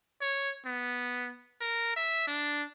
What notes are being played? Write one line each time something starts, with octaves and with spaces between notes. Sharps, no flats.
C#5
B3
A#4
E5
D4